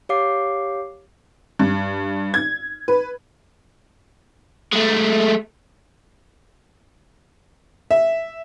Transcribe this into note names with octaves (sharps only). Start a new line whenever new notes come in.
G4 C#5 F5 D6 C7
G2
G#6
B4
G#3 A3
E5